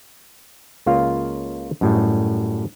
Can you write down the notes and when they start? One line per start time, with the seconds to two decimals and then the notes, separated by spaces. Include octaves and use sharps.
0.86 C#2 C#3 A#3 F4 F5
1.81 F#2 A2 G3